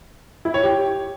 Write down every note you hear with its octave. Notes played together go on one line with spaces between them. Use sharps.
E4
C#5
G4